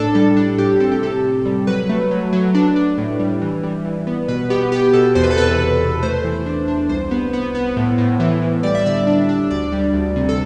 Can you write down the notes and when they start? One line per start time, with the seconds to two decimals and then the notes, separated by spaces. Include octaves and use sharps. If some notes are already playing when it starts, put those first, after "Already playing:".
Already playing: A2 D4 A4
0.15 G3 A4
0.37 D4
0.58 A2 G4
0.80 C4 A4
0.92 G4
1.02 C3 A4
1.24 C3
1.45 G3
1.67 F#3 B4
1.89 A3
2.11 F#3
2.33 F#3
2.55 D4
2.76 D4
2.98 A2
3.19 G3
3.41 E3
3.63 G3
3.85 E3
4.07 B3
4.28 B2 B4
4.50 B3 G4
4.72 B3 G4
4.93 B2 A4
5.15 E2 C5
5.23 B4
5.31 A4
5.37 C3 B4
5.59 E2
5.80 E2
6.03 A3 C5
6.24 E3
6.46 D4
6.68 D4
6.89 C2 C5
7.11 B3
7.33 B3
7.55 B3
7.76 A2
7.98 A2
8.20 E3
8.42 A2
8.63 G3 D5
8.75 E5
8.86 D3 D5
9.07 D4
9.29 D4
9.51 D2 D5
9.72 G3
9.94 D2
10.16 C3
10.29 A4